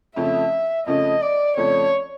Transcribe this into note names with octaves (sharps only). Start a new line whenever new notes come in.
F2 C#3 F3 A3 C#4 E5
F2 C#3 F3 A3 C#4 D#5
D5
F2 C#3 F3 A3 C#4 C#5